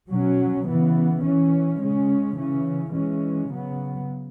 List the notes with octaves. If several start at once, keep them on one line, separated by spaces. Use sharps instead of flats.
B2 F#3 C#4
C#3 E3 B3
E3 C#4
C#3 G#3 C#4
C#3 E3 C#4
E3 G#3 C#4
C#3 F#3 B3